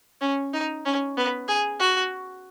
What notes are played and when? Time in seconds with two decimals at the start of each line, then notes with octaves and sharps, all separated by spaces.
0.21 C#4
0.53 D#4
0.86 C#4
1.17 B3
1.48 G#4
1.80 F#4